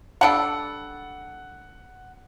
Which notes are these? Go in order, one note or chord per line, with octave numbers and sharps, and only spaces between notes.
G3 D4 A4 F#5